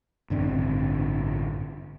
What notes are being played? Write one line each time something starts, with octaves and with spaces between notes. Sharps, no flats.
A1 G2 D3 C4